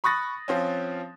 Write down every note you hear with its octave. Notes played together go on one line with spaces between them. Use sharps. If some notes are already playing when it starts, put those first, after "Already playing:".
B5 C#6 D#6 F#6 A6 A#6
F3 C4 C#4